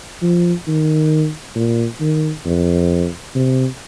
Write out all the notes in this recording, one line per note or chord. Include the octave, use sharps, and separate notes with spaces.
F3
D#3
A#2
D#3
F2
C3